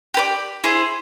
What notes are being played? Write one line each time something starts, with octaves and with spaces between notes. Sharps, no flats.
G4 B4 D5
E4 G#4 C5